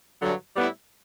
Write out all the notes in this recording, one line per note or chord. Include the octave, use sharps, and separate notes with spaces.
G2 D3 F#3
A2 G3 B3 E4